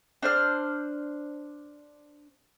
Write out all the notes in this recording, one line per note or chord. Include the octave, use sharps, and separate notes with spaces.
D4 C5 F6